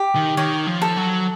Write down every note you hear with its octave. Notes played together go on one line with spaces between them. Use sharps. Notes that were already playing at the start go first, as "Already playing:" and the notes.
Already playing: G4
D#3
D#3 C#5
F3
A4
F#3